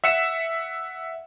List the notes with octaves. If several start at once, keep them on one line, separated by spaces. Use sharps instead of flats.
E5 F#5 C#7 E7